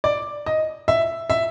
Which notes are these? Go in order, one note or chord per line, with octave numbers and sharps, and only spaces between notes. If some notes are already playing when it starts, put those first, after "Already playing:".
D5
D#5
E5
E5